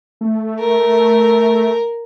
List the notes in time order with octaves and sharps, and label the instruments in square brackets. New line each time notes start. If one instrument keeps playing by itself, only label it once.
[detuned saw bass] A3
[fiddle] A#4